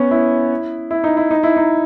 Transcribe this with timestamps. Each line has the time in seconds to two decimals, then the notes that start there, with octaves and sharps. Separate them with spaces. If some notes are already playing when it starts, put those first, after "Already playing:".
Already playing: B3 C#4
0.11 E4
0.91 E4
1.04 D#4
1.17 E4
1.31 D#4
1.43 E4
1.57 D#4